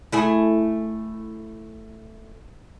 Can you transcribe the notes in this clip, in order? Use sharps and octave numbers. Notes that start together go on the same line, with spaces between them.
A3 E4 G#4